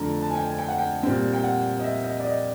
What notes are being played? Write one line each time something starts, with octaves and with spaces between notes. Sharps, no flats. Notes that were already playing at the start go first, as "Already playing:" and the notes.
Already playing: F2 D3 F3 A3 D4 A5 A#5
A5
G#5
G5
G#5
G5
F#5
G5
A#2 G3 C4
G5
F#5
D#5
E5
D#5
D5
D#5